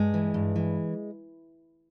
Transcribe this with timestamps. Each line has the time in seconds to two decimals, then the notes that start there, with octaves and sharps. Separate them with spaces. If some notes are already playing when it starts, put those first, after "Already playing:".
Already playing: G2 G#3
0.14 E3
0.34 G2
0.56 E3